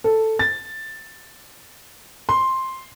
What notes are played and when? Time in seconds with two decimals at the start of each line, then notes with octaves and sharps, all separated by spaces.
0.04 A4
0.39 A6
2.29 C6